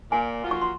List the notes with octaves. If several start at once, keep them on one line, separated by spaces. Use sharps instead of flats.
A#2 G#5
F#3 A#3 F4
C#6
C6